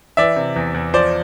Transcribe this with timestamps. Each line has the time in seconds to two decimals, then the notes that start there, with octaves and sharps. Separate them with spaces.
0.17 E3 D5 E5
0.36 C3
0.56 E2
0.74 E2
0.94 F3 C5 D5